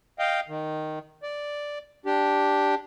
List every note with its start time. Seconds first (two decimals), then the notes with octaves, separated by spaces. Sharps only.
0.19 D#5 F5 G5
0.48 D#3
1.23 D5
2.06 D4 G4